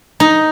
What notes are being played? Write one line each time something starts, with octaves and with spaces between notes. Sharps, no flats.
D#4